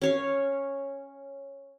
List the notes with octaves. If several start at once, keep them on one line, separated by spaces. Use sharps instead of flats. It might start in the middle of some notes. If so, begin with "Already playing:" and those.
C#4 C#5 F5